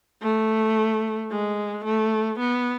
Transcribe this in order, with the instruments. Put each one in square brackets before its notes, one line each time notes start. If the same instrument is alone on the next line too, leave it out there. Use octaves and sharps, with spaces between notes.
[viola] A3
G#3
A3
B3